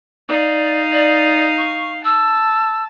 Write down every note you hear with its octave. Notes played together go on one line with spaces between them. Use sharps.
D#4 D5 F5
D5
C#6
A5 E6